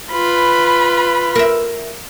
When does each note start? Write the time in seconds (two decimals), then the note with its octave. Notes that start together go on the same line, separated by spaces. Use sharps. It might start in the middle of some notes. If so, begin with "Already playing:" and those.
0.12 F4 B4 B5
1.36 A#4 E5